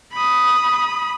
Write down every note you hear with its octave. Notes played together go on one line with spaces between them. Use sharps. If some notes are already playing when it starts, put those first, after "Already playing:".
B5 D#6